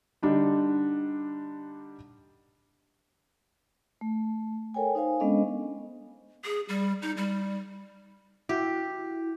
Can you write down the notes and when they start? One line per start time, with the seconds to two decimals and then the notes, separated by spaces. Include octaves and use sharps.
0.23 D3 G3 D4 D#4
4.01 A3
4.74 A4 A#4 C#5 G5 G#5
4.95 D#4 C5 F5 G#5
5.20 G#3 B3 C#4 D4 A4 D#5
6.45 G#4
6.68 G3
7.02 D#4
7.17 G3
8.49 E4 F#4 G4